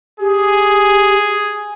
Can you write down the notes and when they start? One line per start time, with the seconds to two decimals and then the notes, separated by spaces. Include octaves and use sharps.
0.20 G4 G#4